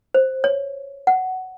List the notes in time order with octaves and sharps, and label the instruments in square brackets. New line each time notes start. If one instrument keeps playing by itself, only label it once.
[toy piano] C5
C#5
F#5